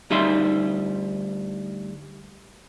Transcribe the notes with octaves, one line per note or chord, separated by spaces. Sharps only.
D2 G3 D#4 E5 C6